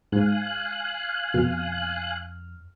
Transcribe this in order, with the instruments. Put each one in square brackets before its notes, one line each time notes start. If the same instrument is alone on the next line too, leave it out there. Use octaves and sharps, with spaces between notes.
[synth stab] G#2 [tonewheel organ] F5 G#5 F#6
[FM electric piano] F2 F6 [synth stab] B2